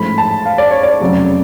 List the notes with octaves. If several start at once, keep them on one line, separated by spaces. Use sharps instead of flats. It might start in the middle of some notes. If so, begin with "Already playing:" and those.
Already playing: A1 G#2 F3 A3 B5
A5
F5
D5
C#5
D5
F1 F2 C#3 F#3